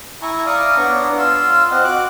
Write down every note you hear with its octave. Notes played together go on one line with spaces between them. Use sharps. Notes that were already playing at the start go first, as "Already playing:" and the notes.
E4 G#5 A#5 C#6
D5 F5 A#5 C#6 D#6
B3 D4 C#5 A#5
F4 F5 C6 E6
C4 D#5 F#5
F#4 D6 F#6